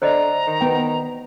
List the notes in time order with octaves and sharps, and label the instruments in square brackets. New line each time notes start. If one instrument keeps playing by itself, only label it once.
[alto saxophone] D3 [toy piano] C5 D5 D#5 [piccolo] A#5
[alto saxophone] D#3
[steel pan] B3 G5